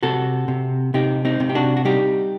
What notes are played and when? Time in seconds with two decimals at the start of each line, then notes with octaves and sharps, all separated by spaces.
0.03 C3 F#4 A4
0.48 C3
0.94 C3 D#4 G4
1.25 C4 D#4
1.40 C3
1.49 G4
1.55 D4 F#4
1.77 F#4
1.85 G3 D#4 G4